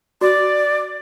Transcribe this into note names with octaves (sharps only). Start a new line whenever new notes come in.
F#4 D5